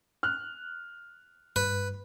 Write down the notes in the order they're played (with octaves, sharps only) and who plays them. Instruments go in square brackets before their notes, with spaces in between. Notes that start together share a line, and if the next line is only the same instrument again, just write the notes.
[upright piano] F6 F#6
[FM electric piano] G2 [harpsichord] B4